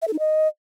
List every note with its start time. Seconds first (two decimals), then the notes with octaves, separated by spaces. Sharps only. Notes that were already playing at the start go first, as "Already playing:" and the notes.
0.02 E5
0.08 A4
0.13 D#4
0.19 D#5